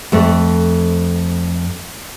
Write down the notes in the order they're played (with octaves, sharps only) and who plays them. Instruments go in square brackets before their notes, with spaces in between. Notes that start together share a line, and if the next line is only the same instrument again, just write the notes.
[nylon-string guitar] F2 A3